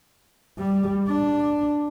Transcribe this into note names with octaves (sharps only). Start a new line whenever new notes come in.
G3
D4